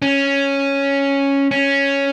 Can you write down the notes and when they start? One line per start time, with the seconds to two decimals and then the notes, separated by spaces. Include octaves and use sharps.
0.02 C#4
1.51 C#4